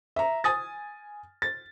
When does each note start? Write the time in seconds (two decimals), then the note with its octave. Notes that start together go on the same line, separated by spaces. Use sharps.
0.16 E5 A#5
0.44 G#5 D#6 A6
1.42 A6